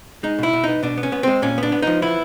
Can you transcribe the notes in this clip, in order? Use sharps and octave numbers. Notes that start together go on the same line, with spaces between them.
G#3 D#4
B2 E4
B2
B3 D#4
B2 D4
B3
C#4
B3
G#3 C4
A#2 C#4
B3 D4
B3
F3 D#4
B3 E4